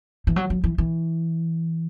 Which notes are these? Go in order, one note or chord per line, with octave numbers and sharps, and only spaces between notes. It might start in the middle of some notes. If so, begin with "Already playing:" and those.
E3
F#3
F#3
E3
E3